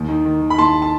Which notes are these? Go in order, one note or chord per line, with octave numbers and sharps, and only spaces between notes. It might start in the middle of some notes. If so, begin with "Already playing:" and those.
Already playing: D#2
D#3
D#3
D#3
B5
D#2 A5 C6
A5